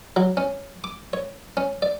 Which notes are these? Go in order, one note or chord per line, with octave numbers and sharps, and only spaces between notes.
F#3
C#4
D6
C#5
C#4
D5